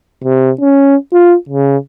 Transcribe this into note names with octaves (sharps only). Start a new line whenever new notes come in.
C3
C#4
F4
C#3